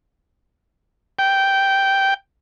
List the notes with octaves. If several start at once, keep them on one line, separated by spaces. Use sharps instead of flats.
G5